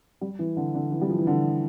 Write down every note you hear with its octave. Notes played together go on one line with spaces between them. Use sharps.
G3
E3
D3
D3
E3
G3
F3
E3
D3